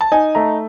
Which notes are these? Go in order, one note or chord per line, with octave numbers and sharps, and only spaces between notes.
A5
D#4 G#5
A3 A#5